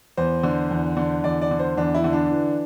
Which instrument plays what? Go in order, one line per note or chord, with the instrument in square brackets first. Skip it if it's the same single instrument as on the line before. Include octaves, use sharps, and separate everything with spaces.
[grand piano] E2 C5
D3
E2
D3
E2 D5
D5
D3
C5
E2 D4
E4
D3
D4
E3